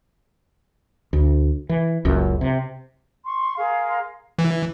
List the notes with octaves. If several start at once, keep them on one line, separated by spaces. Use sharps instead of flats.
D2
E3
F#1 C#2 F#2
C3
C6 C#6
G#4 A#4 F5 C6
E3